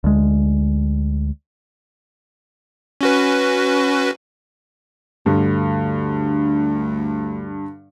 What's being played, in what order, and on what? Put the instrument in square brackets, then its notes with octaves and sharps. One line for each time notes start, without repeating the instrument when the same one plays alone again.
[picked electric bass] D2 G#3
[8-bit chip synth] C#4 F#4 B4
[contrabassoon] D2 [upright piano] G2 D3